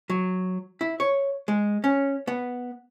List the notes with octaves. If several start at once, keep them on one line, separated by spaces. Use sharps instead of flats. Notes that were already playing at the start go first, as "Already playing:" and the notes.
F#3
E4
C#5
G#3
C#4
B3